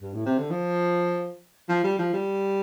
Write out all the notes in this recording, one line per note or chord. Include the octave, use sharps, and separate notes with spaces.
G2
A2
C3
D3
F3
F3
G3
F3
G3